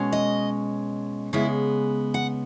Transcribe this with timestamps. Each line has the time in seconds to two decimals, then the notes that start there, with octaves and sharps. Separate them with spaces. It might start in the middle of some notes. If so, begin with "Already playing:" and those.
Already playing: B2 G#3 C#4
0.12 D#5
1.33 C#3 G#3 B3 E4
2.14 F#5